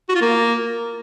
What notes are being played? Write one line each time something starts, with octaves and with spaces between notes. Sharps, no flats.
F#4
F4
A#3